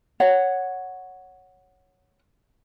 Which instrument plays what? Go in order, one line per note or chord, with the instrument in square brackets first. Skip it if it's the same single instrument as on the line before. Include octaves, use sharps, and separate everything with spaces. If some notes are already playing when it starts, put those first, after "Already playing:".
[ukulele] C#5 F#5